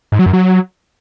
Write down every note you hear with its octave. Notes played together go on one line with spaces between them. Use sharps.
G#2
F#3
F#2
F#3